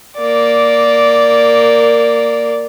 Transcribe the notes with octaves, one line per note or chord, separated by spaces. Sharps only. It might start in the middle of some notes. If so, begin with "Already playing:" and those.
A#3 D5